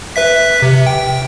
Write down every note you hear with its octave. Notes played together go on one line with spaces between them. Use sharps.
B4 E5 B6
C3
G5